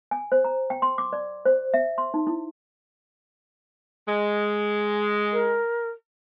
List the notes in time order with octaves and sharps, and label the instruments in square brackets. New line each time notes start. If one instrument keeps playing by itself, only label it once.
[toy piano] G#5
C5
A#5
G5
C6
D6
D5
C5
E5
C6
D#4
E4
[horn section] G#3
[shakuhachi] A#4